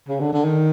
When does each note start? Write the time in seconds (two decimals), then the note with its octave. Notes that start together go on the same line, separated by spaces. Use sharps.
0.08 C#3
0.20 D3
0.33 D3
0.45 D#3